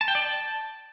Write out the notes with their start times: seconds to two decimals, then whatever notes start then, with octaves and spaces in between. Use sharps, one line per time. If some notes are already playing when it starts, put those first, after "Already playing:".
0.01 A5
0.08 G5
0.15 D5
0.22 A5